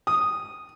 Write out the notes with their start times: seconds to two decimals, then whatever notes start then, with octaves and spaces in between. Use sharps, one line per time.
0.07 D#6